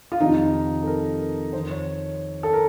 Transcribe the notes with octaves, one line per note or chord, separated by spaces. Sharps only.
F4
F2 C3 D#3 D#4
A4
A#4
F2 D#3 C5
C#5
A4
A#4